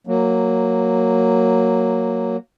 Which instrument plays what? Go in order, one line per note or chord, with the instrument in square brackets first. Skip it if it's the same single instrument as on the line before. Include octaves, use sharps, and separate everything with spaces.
[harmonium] F#3 A#3